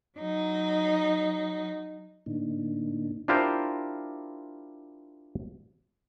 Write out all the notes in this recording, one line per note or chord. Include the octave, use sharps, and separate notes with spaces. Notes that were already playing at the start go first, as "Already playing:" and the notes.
F#3 D#4
A2 D3 A#3 D4 D#4
D4 E4 F4 G4 A#4 C5